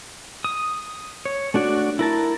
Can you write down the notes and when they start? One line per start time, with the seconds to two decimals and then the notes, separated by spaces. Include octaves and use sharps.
0.44 D#6
1.25 C#5
1.54 A3 D4 F#4 D5
1.99 E4 A#4 A5